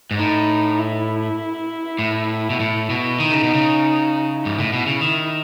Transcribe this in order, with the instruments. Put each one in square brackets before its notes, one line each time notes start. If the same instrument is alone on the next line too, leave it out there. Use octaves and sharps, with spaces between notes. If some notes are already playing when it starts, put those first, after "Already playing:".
[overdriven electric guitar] G#2
[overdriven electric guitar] A2 [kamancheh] D#4
[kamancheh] E4
[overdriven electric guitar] A2
B2
A2
B2
[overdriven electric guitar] D#3 [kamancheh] D#4
[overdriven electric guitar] C#3
B2
C#3
[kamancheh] E4
[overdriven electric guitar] G#2
A2
B2
C#3
D#3